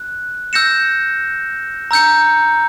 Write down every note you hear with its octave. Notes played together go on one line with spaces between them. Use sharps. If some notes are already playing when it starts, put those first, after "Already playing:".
Already playing: F#6
E6 G6 A#6 C#7 E7
A#5 E6 G6 C#7